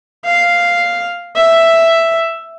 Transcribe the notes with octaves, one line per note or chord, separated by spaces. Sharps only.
F5
E5